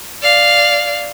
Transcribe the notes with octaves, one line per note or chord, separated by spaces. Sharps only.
D5 F5